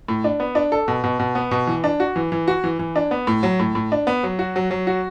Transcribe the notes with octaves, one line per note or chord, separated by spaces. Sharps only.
A2
D4
B3
D4
A4
B2
B2
B2
B3
B2
E3
D4
F#4
E3
E3
F#4
E3
E3
D4
B3
A2
F#3
A2
A2
D4
B3
F#3
F#4
F#3
F#3
F#4